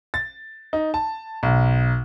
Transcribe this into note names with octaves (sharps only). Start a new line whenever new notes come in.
A6
D#4
A5
B1